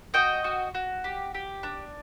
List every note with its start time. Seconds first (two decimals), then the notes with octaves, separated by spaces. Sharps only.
0.14 F#4 D#5 G5
0.44 F#4
0.75 F#4
1.04 G4
1.34 G4
1.63 D4